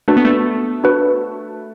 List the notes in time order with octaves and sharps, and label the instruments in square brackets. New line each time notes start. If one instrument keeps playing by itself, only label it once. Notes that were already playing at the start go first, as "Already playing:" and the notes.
[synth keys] A3 [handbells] D4 F#4 B4
[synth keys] B3
A3
[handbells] D4 F#4 B4